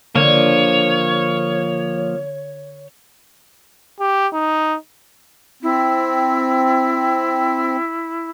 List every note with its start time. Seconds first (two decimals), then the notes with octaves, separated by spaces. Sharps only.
0.16 D3 F3 A#3 C#5
4.00 G4
4.34 D#4
5.63 C4 E4